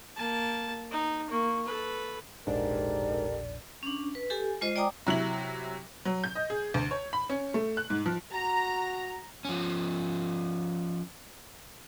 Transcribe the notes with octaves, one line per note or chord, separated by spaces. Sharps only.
A#3 A5
D#4
A#3 C#6
A4 B4
E1 A#1 G#2 D4 G4 A4 A#4 D5
C#4 D4
B4
G4 A4 G#5
G#3 F4 C5 D#5
D5 G5 G#5 A#5 D6 D#6
C3 F#3 E4 F#7
F#3
G6
D#5
G#4
D2
C#5
B5
C#4
A3
F#6
G#2
F3
F#4 A#5
F3 C#4